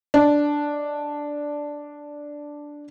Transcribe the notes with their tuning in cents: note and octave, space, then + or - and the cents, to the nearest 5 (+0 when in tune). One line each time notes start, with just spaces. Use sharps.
D4 +0 D#5 -10